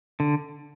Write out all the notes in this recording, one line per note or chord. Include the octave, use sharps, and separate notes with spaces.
D3